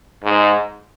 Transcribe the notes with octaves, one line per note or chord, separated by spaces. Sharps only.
G#2